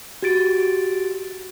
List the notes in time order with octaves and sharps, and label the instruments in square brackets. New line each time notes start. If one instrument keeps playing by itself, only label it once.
[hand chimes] F#4 G4 A6 D7